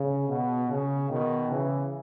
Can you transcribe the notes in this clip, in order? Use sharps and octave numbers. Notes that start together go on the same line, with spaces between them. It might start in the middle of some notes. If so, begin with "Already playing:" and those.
Already playing: C#3
B2
C#3
B2 D#3
C#3 E3